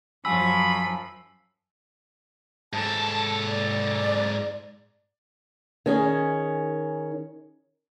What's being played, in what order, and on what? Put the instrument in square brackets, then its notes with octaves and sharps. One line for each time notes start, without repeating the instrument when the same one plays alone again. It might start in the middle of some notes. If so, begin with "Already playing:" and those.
[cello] F#2 F3 [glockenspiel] G#5 E6 [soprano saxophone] B5
[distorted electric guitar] G#2 A4 [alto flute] A5
[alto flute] D5
[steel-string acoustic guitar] D#3 C#4 G#4